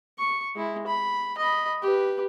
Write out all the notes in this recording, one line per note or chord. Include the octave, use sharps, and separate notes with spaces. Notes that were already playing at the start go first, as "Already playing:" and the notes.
C#6
G#3 E4
B5
D#5 B5
G4 B4